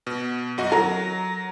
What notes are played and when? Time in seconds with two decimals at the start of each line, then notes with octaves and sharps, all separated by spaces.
0.07 B2
0.58 F#2 F#4 D#5
0.72 F#3 A#4